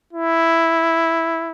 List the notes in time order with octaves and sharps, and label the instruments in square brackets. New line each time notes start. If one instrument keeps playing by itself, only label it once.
[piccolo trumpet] E4